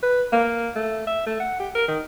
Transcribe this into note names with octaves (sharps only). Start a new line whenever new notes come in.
B4
A#3
A3
E5
A3
F#5
G4
A#4
D#3